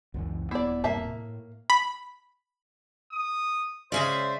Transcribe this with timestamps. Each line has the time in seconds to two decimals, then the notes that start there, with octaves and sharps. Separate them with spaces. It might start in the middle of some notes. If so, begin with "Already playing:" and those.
0.14 C#2 F#2 E3
0.51 D#1 B3 E4 D5
0.84 D#1 G2 C3 A#3 E5 A5
1.04 A2
1.70 B5
3.12 D#6
3.92 C#3 G#3 C#4 C5 D5 E5 G#5